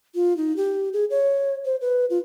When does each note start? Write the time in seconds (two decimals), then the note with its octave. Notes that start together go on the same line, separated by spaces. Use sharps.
0.15 F4
0.37 D#4
0.57 G4
0.93 G#4
1.10 C#5
1.65 C5
1.81 B4
2.10 F4